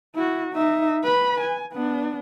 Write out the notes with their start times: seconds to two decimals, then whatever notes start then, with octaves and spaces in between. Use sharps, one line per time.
0.15 E4 F#4
0.53 D#4 E5
1.04 B4 B5
1.41 G#5
1.72 B3 D4